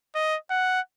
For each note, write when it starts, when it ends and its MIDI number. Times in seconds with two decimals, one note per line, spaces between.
0.15 0.37 75
0.50 0.81 78